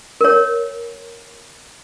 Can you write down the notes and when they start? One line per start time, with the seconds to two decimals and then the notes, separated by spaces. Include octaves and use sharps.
0.21 A#4 C#5